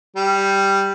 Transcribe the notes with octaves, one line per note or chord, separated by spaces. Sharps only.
G3